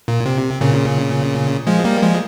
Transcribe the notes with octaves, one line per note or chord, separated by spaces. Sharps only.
A#2
C3
A#2 C#3
F3 G#3
G3 A#3
F3 G#3